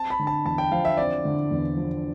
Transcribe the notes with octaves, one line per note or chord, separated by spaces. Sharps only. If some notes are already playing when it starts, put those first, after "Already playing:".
Already playing: C4 A5
B5
D3
A5
E2 A5
G5
F3 F5
E5
C4 D5
D3
E2
F3